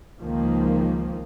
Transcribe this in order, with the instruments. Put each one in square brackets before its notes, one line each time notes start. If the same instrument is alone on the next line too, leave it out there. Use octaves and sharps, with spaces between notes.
[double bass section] C#2 D#3 F3 A#3